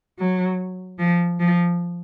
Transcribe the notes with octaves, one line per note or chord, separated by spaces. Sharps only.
F#3
F3
F3